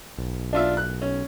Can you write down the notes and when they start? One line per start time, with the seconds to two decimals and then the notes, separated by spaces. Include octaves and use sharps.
0.18 B1
0.53 D4 F4 E5
0.77 F#6
1.02 C#4